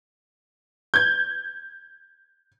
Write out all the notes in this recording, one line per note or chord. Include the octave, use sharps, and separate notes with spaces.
G6 G#6